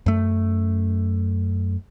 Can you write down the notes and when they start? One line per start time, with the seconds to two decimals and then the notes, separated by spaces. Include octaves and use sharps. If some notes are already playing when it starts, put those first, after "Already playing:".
0.06 F#2 A3